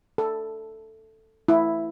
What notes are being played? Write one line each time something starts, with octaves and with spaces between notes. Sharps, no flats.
A4
E4